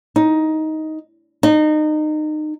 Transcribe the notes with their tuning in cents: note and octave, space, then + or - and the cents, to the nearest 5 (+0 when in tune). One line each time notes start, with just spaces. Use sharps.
D#4 +10
D#4 -25